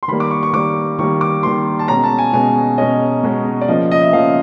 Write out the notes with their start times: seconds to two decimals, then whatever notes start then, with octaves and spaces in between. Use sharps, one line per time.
0.03 C6
0.08 D#3 G3 A#3 B5
0.20 D6
0.31 C#6
0.43 C#6
0.53 D#3 G3 A#3 D6
0.99 D#3 G3 A#3 C#6
1.21 D6
1.43 D#3 G3 A#3 C6
1.79 A5
1.88 B2 G#3 C#4 A#5
2.04 A5
2.19 G#5
2.33 B2 G#3 C#4 G#5
2.78 B2 G#3 C#4 D#5
3.23 B2 G#3 C#4
3.61 D5
3.68 C#3 F3 A#3 D#5
3.91 D#5
4.02 E5
4.13 C#3 F3 A#3 F5